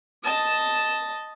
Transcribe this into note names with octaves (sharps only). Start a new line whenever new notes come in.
D#5 A5